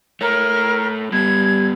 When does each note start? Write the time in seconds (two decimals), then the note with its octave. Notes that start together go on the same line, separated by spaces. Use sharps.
0.21 A3 A#4 C#5
1.12 G3 B3 G4 G#6